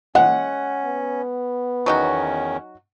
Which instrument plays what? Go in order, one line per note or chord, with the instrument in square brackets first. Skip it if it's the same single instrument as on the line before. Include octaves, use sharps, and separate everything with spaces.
[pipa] G#3 [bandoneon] C#4 [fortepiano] F#5
[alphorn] B3
[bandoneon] E2 D#3 C#4 [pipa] F#3 D#4 F#4